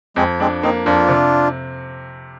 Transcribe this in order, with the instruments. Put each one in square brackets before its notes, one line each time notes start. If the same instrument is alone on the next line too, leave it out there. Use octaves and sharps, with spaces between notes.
[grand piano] F2 [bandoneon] G#3 C4
[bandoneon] G#3 C4 [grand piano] D4
[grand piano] A#3 [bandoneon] C4 D#4
[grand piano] F2 [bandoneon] D4 F4
[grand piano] C3